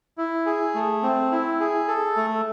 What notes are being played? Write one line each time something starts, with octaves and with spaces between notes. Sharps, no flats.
E4
G#4
A3
C4
E4
G#4
A4
A3